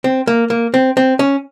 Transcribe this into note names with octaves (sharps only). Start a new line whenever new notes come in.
C4
A#3
A#3
C4
C4
C#4